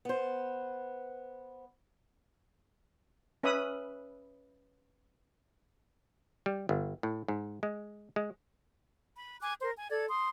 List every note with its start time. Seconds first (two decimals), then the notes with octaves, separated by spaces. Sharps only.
0.05 B3 C5
3.43 C#4 B4 E5 B5 D#6
6.46 G3
6.69 G1
7.03 A2
7.28 G#2
7.63 G#3
8.16 G#3
9.17 B5
9.41 G#5 D6 F#6
9.62 A#4 C5
9.75 G#5
9.90 A4 D5 G#6
10.08 C6 D#6